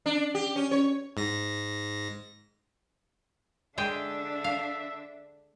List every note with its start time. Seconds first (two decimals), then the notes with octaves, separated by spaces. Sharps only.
0.06 D4
0.35 G4
0.56 C#4
0.71 C#5
1.17 G#2 A#6
3.78 D3 G#3 D4 G#4 E5 G5
4.44 F5